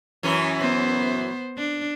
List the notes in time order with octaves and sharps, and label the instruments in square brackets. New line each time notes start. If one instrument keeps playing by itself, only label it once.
[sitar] F#2 E3 C#4
[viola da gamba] B3 C5
D4